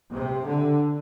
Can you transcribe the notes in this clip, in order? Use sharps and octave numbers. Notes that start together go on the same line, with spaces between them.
C3
D3